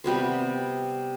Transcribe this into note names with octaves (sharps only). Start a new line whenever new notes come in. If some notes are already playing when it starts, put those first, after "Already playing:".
C3 G3 B3 C5